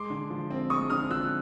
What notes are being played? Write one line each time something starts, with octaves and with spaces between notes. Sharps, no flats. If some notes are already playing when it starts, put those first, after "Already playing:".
Already playing: G#3 C6 D6
D3
F3
C4
G#3 C#6 D#6
D3 D#6 F6
F3 E6 F#6